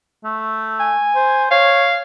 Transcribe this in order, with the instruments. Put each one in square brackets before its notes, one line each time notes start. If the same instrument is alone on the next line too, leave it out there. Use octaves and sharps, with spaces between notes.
[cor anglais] A3
[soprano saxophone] G#5
[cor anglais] C5
[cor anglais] C#5 [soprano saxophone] F5